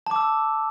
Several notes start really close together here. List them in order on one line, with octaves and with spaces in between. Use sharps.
A5 D6 E6